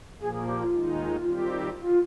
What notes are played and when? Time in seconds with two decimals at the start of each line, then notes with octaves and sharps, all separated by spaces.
0.21 A#2 F3 A#3 G#4
0.33 G#4
0.47 G4
0.61 F4
0.74 D#2 D#3 G#3 D#4
1.26 D#3 G3 C4 G4
1.80 F4